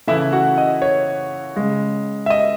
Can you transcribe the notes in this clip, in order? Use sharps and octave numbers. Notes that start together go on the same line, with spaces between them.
C#3 E3 A3 E4 E5
F#4 F#5
D#5
C#5
C#3 G#3
E5
D#5